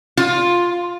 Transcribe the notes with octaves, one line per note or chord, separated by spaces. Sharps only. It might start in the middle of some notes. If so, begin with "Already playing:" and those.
F4